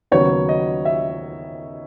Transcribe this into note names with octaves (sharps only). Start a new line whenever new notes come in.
D#2 C#3 F#3 B3 C#5
D#5
E5